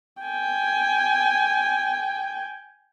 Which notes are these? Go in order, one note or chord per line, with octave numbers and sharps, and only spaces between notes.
G5 G#5